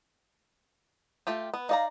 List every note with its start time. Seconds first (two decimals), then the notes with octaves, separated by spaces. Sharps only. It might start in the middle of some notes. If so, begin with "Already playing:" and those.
1.27 A3 F4 G4
1.54 B3
1.69 D#4 D5 F5 A#5